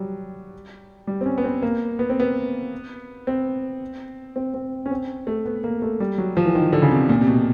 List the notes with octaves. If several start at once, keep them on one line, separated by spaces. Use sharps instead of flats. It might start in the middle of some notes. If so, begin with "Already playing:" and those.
Already playing: F#3 G3
G3
C4
C#4
B3
C4
A#3
B3
C4
B3
C4
C4
C4
C#4
C4
A3
B3
A#3
A3
G3
F#3
F3
E3
D#3
D3
C#3
C3
A#2
C3
B2